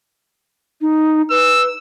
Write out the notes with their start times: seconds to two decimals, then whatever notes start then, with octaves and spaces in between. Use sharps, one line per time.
0.81 D#4
1.30 B4 E6